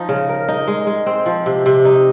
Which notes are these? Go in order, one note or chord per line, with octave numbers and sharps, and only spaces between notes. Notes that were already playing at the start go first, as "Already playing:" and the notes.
Already playing: F3 D#4
C#3
A#4
D#4
G#3
G#3
C4
F3
C3
C3
D#4